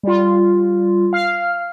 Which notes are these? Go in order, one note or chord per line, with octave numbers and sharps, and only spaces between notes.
G3 F4
F5 F6